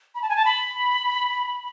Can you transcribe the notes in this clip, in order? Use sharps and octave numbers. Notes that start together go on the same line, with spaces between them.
B5
A5
G#5
A5
B5